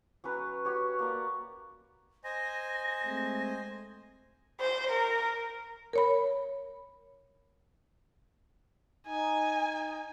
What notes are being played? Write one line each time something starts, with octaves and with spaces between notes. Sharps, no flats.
F#3 C#4 B4
F#4 G4 C#5
A#3 D5 A#5
C5 D#5 G#5 A#6
G#3 A3 C4
C5
A#4
A#4 C#5 B5
D#4 G#5